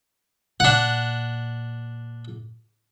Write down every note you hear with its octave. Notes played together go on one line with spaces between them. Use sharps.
A#2 D4 F#5